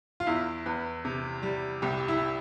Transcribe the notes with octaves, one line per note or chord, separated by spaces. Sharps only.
F4
E2 E4
E2 B4
C3
G3
C2 G4
E4